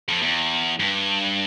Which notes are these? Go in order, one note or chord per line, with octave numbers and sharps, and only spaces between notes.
F2
E2
G2